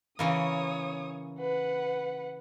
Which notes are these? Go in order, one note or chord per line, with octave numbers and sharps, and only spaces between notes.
C#3 E3 A#3 C#5 D#6
B4 F#5